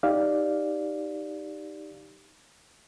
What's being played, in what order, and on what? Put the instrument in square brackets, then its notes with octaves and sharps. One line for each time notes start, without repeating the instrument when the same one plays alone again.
[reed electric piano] D#4 G4 D5 F5